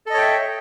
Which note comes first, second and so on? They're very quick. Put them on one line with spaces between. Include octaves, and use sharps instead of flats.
A4 D#5 C#5 G5 E5